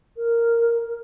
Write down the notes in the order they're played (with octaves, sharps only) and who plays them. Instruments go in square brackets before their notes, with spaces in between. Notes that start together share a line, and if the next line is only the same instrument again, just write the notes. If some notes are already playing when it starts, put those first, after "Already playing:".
[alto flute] A#4